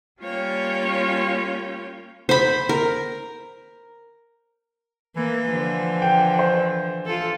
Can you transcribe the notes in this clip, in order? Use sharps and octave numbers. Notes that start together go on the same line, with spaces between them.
G3 A#3 C#4 F4 C#5 G5
C5 B5
A#4
E3 A#3
D3 F3
G5
C5
F4 A4